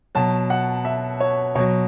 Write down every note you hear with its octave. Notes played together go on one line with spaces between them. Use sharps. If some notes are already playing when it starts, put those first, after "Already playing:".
B2 F#3 A5
F#5
E5
C#5
B2 F#3 C#5